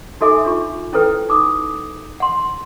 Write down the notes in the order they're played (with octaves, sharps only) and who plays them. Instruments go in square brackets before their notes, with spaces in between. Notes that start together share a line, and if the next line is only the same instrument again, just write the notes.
[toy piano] D#4 F#4 A4 E5 G#5 D6
D4 F4 C#6
C#4 E4 A4 B4 G5
D#4 D6 D#6
F#5 C6